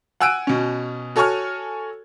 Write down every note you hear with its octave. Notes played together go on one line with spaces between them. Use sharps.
F#5 G#5 E6 F#6 D7 D#7
B2 C#4
F#4 A4 C#5 G#5 C#6 F6